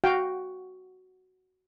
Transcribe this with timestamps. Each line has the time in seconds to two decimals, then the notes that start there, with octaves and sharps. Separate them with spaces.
0.04 F#4 F5 G5